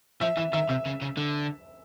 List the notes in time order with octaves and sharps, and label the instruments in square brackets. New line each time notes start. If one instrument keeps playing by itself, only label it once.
[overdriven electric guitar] F3 [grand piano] E5
[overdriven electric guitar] E3 [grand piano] E5
[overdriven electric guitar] D#3 [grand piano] E5
[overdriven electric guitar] C3 [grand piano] E5
[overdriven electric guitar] C#3
C#3
D3